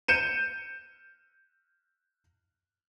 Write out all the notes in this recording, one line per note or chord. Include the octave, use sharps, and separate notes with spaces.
G6 C#7 D#7 E7